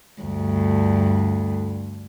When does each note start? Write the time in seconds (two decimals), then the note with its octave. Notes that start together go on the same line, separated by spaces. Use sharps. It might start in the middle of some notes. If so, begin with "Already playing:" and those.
0.21 D2 G2